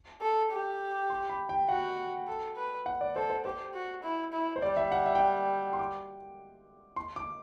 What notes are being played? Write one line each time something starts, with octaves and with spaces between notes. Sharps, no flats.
A4
G4
C6
B5
G5
F#4 F#5
A4
B4
F#5
D5
A4 C5
C5
G4 C5
F#4
E4
E4
C5
G3 D5
E5
F#5
E5
G5
F#5
C6
D6
C6
D6